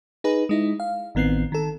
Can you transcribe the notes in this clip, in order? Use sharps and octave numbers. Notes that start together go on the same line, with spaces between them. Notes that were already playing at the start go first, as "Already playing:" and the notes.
D#4 G#4 B4
G#3 D#4 E4
F5
A1 D#3 B3 C4 C7
D#3 A4